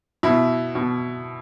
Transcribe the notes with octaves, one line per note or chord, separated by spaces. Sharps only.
B2 E4
B2